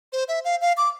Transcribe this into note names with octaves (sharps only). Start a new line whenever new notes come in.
C5
E5
F5
F5
D6